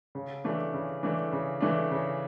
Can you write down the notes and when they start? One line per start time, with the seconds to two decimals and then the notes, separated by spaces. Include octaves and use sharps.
0.15 C#3
0.44 E3 A3 D4
0.74 C#3
1.03 E3 A3 D4
1.32 C#3
1.61 E3 A3 D4
1.91 C#3